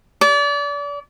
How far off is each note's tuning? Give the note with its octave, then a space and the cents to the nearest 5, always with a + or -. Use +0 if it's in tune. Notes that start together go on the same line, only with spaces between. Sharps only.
D5 -35